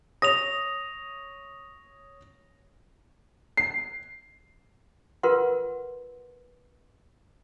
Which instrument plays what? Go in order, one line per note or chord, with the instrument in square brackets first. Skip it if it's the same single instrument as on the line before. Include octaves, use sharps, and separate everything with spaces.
[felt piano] C#5 D#6 [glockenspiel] A#6 F7
[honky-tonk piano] C7
[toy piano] F4 A#4 B4 F#5 C6